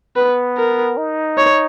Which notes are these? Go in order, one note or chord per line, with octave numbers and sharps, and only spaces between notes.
B3 B4
A#4
D#4
C#5